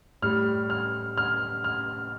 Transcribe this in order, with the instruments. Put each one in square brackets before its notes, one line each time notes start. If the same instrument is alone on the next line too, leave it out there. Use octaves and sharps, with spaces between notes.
[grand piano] A2 G3 F6
F6
F6
F6